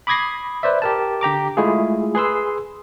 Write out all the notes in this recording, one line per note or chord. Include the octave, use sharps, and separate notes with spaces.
B5 D6 D#6 G#6 A#6 C7
B4 C5 D5 E5
G4 A#4 A5
D3 G4 A#5 D6
G#3 A3 E4 F4 G#4
G#4 B4 C6 E6